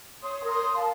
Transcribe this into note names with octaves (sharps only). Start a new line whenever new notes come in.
C#5 C6 D#6
A#4
C6 D#6
A#4
F5 A5